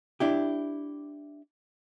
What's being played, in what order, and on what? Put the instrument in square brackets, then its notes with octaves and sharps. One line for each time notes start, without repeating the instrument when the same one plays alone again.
[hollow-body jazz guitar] D4 E4 G4